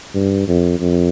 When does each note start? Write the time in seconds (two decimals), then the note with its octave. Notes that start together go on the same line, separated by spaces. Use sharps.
0.14 G2
0.48 F2
0.80 F2